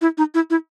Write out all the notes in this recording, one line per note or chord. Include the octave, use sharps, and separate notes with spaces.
E4
D#4
E4
E4